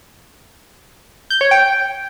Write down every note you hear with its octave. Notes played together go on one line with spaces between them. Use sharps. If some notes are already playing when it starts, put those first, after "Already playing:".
G6
C#5
G5